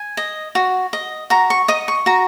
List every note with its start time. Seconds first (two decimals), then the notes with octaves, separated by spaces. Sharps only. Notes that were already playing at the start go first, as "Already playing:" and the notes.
Already playing: G#5
0.17 D#5
0.55 F#4
0.93 D#5
1.30 F#4 A#5
1.50 C#6
1.68 D#5 D#6
1.88 C#6
2.06 F#4 A#5